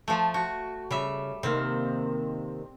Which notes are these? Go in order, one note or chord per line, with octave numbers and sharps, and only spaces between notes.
F3 A3
F#4
C#3 G3 E5
C3 D#3 A#3 C4